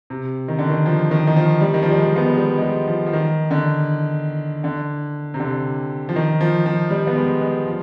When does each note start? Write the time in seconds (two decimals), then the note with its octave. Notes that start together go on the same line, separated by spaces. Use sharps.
0.10 C3
0.48 D#3
0.59 D3
0.70 D#3
0.86 F3
1.11 D#3
1.27 D#3
1.36 F3
1.61 G3
1.74 D#3
1.83 F3
1.90 G3
1.99 G#3
2.16 B3
2.26 G#3
2.37 G3
2.58 G#3
2.62 G3
2.88 F3
3.06 F3
3.13 D#3
3.51 D3
4.64 D3
5.34 C3
5.40 D3
6.09 F3
6.16 D#3
6.41 F3
6.66 F3
6.90 G3
7.07 B3
7.16 G#3
7.41 G#3
7.66 F3